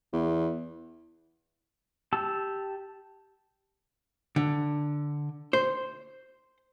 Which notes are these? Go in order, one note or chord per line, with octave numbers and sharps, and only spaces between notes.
E2
G4 A5 E6
D3
C5